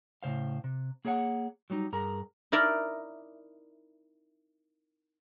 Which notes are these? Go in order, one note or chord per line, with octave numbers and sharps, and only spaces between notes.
A2 C#3 C5 F5
C3
A#3 G#4 C#5 F5 F#5
F#3 G3 A#3 D#4
G2 G#4 A#4 A#5
D#4 E4 A#4 D5 E5